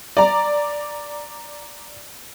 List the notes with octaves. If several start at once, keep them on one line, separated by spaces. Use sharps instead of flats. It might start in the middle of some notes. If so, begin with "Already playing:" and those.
D5 A#5